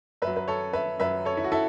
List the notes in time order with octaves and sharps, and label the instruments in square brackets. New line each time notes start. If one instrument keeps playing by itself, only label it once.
[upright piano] F#2 B4 E5
F#3
B4
A4 C#5
B4 E5
F#2 F#3 B4 E5
A4 C#5
E4
F#4
E4 A4